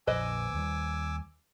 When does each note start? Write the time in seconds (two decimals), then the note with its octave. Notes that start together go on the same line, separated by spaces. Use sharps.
0.07 A#1 F2 B4 C5 D#5 G#5 D6 E6
0.54 D#2 G3